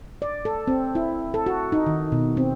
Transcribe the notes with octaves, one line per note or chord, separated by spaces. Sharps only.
D5
A4
C4
E4
A4
F#4
D#4
D#3
B2
C4